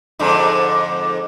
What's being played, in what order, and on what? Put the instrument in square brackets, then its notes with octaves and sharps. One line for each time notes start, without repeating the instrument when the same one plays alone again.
[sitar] F2 G#2 D3